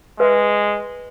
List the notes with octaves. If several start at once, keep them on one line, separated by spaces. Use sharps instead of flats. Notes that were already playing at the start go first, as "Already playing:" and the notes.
G#3 B4 E5